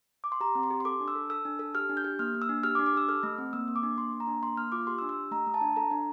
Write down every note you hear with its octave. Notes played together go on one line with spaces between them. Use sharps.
D6
C6
G4 A#5
C4
C6
G4
C6
A4 D6
D4
E6
A4
A4 E6
D4
A4
G4 F6
D4
G6
G4
A#3 F6
A#3
E6
D4
G4 F6
D6
D4
D6
G4 E6
A4 F6
A3
C4
A#3 E6
A#3
D6
D4
A#3 C6
A#3
A#5
D4
A#3 C6
A#3 F6
F4 D6
G4 C6
E6
D4
E6
G4
A3 A#5
A3
A5
D4
A4 A#5
D4